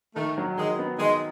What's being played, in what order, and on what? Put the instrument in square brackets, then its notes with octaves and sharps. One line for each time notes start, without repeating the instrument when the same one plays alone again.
[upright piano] D#3 [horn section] A3
[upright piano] F#3
[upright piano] D#3 [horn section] G#3
[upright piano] B3
[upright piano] D#3 [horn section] G#3